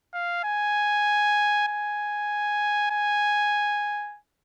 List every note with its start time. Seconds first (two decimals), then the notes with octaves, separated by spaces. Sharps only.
0.14 F5
0.44 G#5
1.68 G#5
2.91 G#5